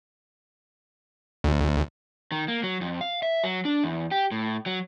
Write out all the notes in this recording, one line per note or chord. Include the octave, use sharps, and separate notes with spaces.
D2
D#3
A#3
F#3
F2
F5
E5
F#3
D4
E2
G4
A2
F#3